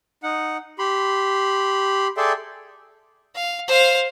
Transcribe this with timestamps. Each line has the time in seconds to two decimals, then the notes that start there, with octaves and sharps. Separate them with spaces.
0.23 D#4 F#5
0.79 G4 B5 C6
2.17 G#4 A4 D5 E5 G5 C6
3.35 F5
3.68 C5 F5